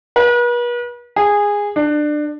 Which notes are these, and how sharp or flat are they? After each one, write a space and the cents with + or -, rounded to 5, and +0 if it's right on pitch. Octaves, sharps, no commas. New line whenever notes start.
B4 -40
G#4 -15
D4 +25